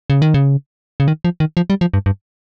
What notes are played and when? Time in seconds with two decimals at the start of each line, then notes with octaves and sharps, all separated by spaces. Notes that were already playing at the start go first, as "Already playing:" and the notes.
0.10 C#3
0.22 D#3
0.34 C#3
1.00 C#3
1.08 D#3
1.25 F3
1.40 D#3
1.57 F3
1.70 G3
1.81 F3
1.94 G2
2.06 G2